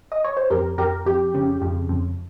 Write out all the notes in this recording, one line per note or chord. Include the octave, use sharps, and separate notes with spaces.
D#5
C#5
C5
F2 G4 A#4
F2 G4 A#4
F2 G4
C#3
F2
F2